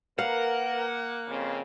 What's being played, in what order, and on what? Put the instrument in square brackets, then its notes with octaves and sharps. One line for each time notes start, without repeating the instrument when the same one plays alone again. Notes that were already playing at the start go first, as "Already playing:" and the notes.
[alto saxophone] A#3 [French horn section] A#4 B4 [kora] F5 [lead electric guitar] F#5
[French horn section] F2 C#3 C4